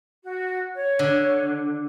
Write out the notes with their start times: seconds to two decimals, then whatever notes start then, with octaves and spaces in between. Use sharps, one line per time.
0.24 F#4
0.75 C#5
0.99 D3